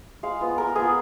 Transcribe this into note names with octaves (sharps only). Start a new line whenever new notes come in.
G#3 F5
B3 F4
G#3 A#4
B3 F4 G#4